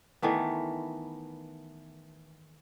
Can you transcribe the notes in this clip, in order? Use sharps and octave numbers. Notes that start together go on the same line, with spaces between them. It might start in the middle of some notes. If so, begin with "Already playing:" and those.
D#3 E3 A3 B3